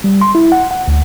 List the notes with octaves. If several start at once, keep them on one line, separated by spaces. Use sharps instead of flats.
G3
C6
E4
F#5
F#5
D2